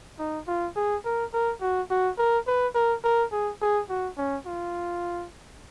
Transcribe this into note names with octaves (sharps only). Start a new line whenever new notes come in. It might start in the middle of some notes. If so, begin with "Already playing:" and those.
D#4
F4
G#4
A#4
A#4
F#4
F#4
A#4
B4
A#4
A#4
G#4
G#4
F#4
C#4
F4